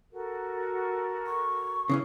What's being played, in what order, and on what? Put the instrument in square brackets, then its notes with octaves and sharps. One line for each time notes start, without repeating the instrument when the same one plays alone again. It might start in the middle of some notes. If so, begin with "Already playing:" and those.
[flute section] F#4 A4 A#4
[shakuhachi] C#6
[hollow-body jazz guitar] C#3 E3 C#4